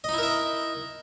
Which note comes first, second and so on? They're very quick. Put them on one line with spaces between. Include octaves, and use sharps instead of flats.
D#5 D#4 E4 A#4 E5